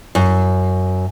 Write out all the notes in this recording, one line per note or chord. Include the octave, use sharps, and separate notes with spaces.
F#2